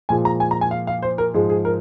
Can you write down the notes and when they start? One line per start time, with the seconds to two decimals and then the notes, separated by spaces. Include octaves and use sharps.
0.09 A#2 F3 G#3 G#5
0.25 A#5
0.40 G#5
0.51 A#5
0.61 G#5
0.71 F5
0.87 F5
1.02 C5
1.18 A#4
1.34 G#2 F3 G#3 G#4
1.50 G#4
1.65 A#4